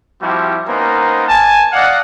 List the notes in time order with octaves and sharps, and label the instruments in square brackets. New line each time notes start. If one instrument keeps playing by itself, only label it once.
[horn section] F3 G3 C4 E4 F#4 G4
A#3 B3 C#4 D#4 A#4 C5
G#5 A5
D5 D#5 F5 F#5